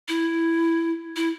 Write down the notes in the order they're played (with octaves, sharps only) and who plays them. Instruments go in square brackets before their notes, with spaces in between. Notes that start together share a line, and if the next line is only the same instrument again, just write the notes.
[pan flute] E4
E4